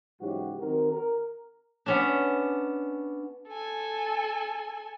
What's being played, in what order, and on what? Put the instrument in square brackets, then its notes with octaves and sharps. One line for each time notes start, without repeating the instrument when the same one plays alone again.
[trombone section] G#2 C#3 E3 F#3 F#4 G4
D#3 C4 F#4 A#4
A#4
[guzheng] B3 C#4 D4
[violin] A4 G#5